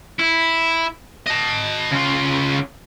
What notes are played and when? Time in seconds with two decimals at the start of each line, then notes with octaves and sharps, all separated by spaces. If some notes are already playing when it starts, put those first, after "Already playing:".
0.20 E4
1.27 D#5 A5
1.92 C#3 F4